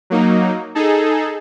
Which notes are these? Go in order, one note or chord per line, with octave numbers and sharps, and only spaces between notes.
F#3 A#3 D#4
D#4 G#4 A4